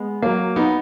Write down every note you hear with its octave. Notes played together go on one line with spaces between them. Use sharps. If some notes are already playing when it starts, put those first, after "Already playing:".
Already playing: G#3 B3
F#3 A#3
B3 D#4